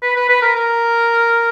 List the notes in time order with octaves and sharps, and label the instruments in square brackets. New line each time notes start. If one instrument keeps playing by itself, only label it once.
[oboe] B4
B4
B4
A#4
A#4